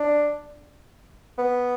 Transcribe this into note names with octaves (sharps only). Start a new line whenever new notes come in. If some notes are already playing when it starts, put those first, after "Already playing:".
Already playing: D4
B3